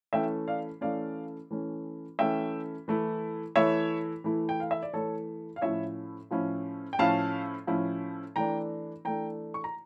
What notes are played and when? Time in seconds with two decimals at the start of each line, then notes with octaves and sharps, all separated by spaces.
0.13 E3 A3 C#4 E5 G5
0.47 D5 F5
0.81 E3 A3 C#4 D5 F5
1.51 E3 A3 C#4
2.19 E3 A3 C#4 E5 G5
2.88 E3 A3 E4
3.56 E3 A3 E4 C#5 E5
4.24 E3 A3 E4
4.49 G5
4.60 F5
4.71 E5
4.82 D5
4.93 E3 A3 E4 A4 C#5
5.56 F5
5.61 A2 F3 C#4 E4 C#5 E5
6.31 A2 F3 C#4 E4
6.93 G5
6.99 A2 F3 C#4 E4 F5 A5
7.67 A2 F3 C#4 E4
8.36 E3 A3 D4 G5 A#5
9.05 E3 A3 D4 G5 A#5
9.54 C#6
9.64 A#5